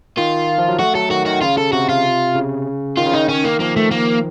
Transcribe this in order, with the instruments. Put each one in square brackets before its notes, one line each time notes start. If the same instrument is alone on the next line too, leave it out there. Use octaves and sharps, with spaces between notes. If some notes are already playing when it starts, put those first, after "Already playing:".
[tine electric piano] D#3 [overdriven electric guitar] F4
[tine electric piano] F3
F#3
[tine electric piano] A3 [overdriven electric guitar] F#4
[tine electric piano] F#3 [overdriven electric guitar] A4
[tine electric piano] D#3 [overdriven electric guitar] F#4
[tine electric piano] D#3 [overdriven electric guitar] F#4
[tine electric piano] C#3 [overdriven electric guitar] F4
[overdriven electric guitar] A4
[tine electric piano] C3 [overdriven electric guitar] F#4
[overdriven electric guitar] F4
[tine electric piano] C#3
[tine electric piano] D#3 [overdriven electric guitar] F4
[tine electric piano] C#3
[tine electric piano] D#3 [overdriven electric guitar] D#4
[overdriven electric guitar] C#4
A#3
[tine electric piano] F3 [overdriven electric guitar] A#3
[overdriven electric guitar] A3
A#3